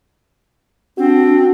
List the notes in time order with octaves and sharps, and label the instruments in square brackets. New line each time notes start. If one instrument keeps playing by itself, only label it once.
[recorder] C4 [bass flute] D4 [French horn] F#4